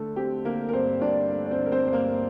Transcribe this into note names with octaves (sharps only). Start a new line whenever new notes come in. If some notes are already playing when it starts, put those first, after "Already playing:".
Already playing: D3 A3
C4 G4
D3 A#3 A#4
A#4
G2 C4 C5
G2 D4 D5
A3
D5
C4 C5
D3
A#4
C4 C5
G2 C5
A#3 A#4